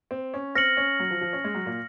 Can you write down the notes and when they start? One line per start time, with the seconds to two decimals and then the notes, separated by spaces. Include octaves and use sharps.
0.11 C4
0.34 C#4
0.55 C4 F6 A#6 C#7 F#7
0.77 C#4
1.00 F#3
1.11 F3
1.21 F3
1.33 C#4
1.44 G#3
1.55 F#3
1.66 A#2